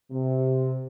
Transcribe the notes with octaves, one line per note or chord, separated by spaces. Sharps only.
C3